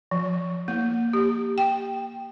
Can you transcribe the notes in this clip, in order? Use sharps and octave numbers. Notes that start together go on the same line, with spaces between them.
F3
A#3
G4
G5